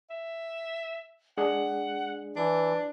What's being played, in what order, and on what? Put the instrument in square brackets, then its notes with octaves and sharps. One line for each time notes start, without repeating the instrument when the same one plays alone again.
[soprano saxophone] E5
[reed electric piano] G#3 D4 G#4 [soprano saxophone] F#5
[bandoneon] E3 [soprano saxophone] D4